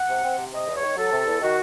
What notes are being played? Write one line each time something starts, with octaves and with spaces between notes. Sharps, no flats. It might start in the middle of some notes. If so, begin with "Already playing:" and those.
Already playing: F#5
C3
C4
C3
C3 D#5
E2
C#5
D#3
F#3 A4
C3
E2
D#3 F#4